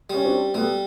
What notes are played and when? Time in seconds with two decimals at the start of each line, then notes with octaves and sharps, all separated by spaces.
0.10 G3 C#4
0.24 C4 D4
0.54 G3 A3 B3